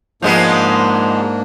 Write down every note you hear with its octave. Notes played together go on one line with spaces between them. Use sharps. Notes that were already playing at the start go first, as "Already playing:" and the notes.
G#2 F3 G#3 A#3 B3 D4